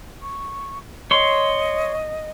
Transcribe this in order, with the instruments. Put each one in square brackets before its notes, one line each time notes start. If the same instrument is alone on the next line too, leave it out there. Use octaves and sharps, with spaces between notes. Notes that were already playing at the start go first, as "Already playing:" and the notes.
[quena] C#6
[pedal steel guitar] C#5 C6 [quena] D#5